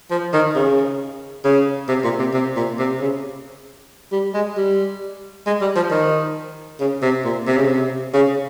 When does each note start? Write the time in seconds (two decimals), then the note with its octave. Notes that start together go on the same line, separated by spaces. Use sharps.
0.10 F3
0.33 D#3
0.55 C#3
1.45 C#3
1.89 C3
2.04 A#2
2.19 C3
2.33 C3
2.56 A#2
2.79 C3
3.01 C#3
4.12 G3
4.34 G#3
4.57 G3
5.47 G#3
5.61 G3
5.76 F3
5.91 D#3
6.80 C#3
7.02 C3
7.25 A#2
7.47 C3
7.58 C#3
7.68 C3
8.14 C#3